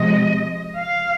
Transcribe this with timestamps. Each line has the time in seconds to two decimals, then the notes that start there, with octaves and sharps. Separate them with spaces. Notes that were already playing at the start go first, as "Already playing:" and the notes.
Already playing: C3 F3 G#3 D#5
0.76 F5